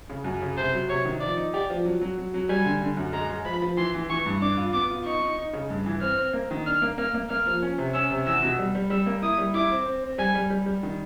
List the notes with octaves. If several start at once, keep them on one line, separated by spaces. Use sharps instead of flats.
C#3
F#2
C#3
C3 C5
F#3
C3 C#5
D#3
F3 D5
D#4
G4 D5
F3
F#3
F#3
F#3
F#3
G3 G#5
D3
D3
F#2
G#3 A#5
G#3
F3 B5
F3
E3 C6
E3
E3 C#6
G2
D4 D6
F4
B3 D6
F4
D#4 C#6
D#4
D#4
C#3
G2
E3
C4 F6
C4
A#3
D#3
D4 F6
A#3
A#3 F6
A#3
A#3 F6
F3
C#4
C3
C#4 E6
C3
E2 E6
B2
G3
G3
G3 E6
A#3
E4 D#6
G3
E4 D6
C4
C4
C4
G3 G#5
G3
G3
G3
D#3